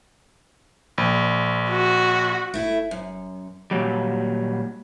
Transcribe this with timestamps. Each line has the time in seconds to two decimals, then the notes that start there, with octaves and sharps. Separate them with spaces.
0.98 A#1
1.70 F#4
2.54 F#1 A3 E4
2.91 F#2
3.71 A#2 F#3 G3